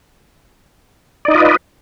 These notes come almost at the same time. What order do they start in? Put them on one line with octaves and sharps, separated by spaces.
D5 D#4 D#5 F4 B4